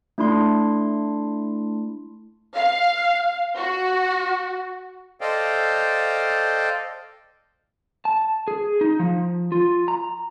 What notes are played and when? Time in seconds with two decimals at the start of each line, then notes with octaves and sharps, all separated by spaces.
0.18 A3 D4 E4 C6
2.55 F5
3.57 F#4
5.21 A4 C5 D5 D#5 F5 G5
8.05 A5
8.48 G#4
8.81 D#4
8.99 F3
9.52 F4
9.88 A#5